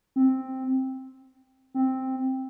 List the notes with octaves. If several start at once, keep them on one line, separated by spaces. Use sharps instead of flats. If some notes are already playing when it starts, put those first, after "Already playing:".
C4
C4